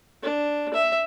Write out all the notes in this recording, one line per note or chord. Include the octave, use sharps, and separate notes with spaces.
D4
E5